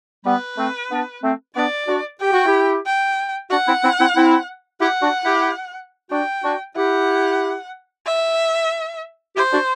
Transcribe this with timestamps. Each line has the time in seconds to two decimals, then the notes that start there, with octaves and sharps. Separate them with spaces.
0.25 G3 B3 B4
0.58 A3 C4
0.91 B3 D4
1.23 A3 C4
1.55 B3 D4 D5
1.88 D4 F#4
2.21 G4 G5
2.33 F#4
2.46 E4 G4
2.86 G5
3.50 D4 F#4 F#5
3.67 C4 E4
3.83 C4 E4
4.00 C4 E4
4.16 C4 E4
4.81 E4 G4 F#5
5.02 D4 F#4
5.24 E4 G4
6.11 D4 F#4 G5
6.44 D4 F#4
6.76 E4 G4 F#5
8.06 E5
9.36 E4 G4 C5
9.53 D4 F#4